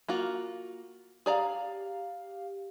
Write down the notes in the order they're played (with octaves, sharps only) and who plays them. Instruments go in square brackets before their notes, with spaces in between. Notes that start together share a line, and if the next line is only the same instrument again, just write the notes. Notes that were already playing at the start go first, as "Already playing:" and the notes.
[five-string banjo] A#3 F4 F#4
[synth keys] G4 F5 [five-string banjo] G#4 D5 A#5